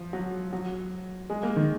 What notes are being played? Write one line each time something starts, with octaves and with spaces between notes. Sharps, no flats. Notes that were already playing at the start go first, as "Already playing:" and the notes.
Already playing: F3
F#3
F#3
G#3
A#3
D#3